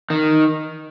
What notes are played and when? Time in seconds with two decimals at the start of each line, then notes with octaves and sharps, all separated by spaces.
0.10 D#3